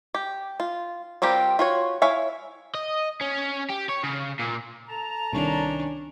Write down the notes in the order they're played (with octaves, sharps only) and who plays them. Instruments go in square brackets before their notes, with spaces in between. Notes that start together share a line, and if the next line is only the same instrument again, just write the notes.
[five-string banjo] G4
F4
G3 C4 F4 G4 A#4
F4 F#4 C#5
E4 C#5 E5 F5 G#5
[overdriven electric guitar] D#5
C#4
G4
C#5
C#3
A#2
[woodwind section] A4 A5 A#5
[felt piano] C2 D#3 [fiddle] C#4 D4